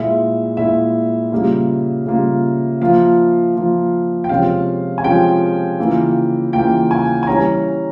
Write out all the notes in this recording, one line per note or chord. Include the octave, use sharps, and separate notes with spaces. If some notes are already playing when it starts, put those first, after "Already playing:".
Already playing: A#2 G#3 E4 E5
A#2 G#3 E4 E5
C#3 G3 A#3 F4
C#3 G3 A#3 F4
F3 A#3 F4 F5
F3 A#3 F4
G5
C3 F3 G#3 C#4 F4 F5
G#5
C3 F3 G#3 C#4 F4 G5
C#3 E3 A#3 F4
C#3 E3 A#3 F4 G5
G#5
G#5
E3 G3 C#4 A#5